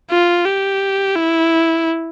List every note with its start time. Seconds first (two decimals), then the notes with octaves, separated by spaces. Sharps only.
0.11 F4
0.46 G4
1.15 E4